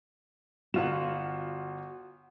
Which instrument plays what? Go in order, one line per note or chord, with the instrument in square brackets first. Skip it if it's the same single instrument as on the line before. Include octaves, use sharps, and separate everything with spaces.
[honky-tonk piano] G1 F4 E7 [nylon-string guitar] F#4 F#5